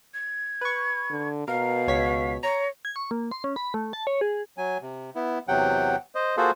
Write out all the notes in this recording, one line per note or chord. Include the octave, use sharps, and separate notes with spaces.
G#6
B4 C#6
D3
B2 A#4 F5
C#2 C#5 B6
C#5 A#5
G#6
C#6
A#3
C6
C#4
B5
A3
A5
C#5
G#4
F#3 G#5
C3
B3 E4
E2 C3 F#3 F#5 G5
C5 D#5
A#3 F4 F#4 G#4 A4 C5